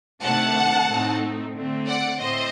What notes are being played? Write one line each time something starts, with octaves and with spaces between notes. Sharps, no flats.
C3 D#3 A3 D4 F#5 A5
A2 A3 C4 D#4
D3 A3 C4
D5 F#5
A2 A3 C4 C5 D#5